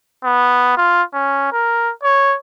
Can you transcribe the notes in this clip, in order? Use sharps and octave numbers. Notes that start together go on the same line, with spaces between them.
B3
F4
C#4
A#4
C#5